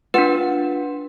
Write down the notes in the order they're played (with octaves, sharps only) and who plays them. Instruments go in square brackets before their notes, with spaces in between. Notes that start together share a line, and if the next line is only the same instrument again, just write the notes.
[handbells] D4 B4 [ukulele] F4 F#5